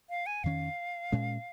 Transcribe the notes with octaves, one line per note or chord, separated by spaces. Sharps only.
F5
G#5
F2 D#3 C#4 F5
A#2 G#3 C#4